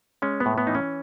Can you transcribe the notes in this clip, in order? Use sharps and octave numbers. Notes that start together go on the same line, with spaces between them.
G#3 C#4
B3
A2
B3
E3 D#4
C#4